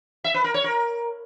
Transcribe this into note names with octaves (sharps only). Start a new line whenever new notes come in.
E5
B4
A#4
C#5
A#4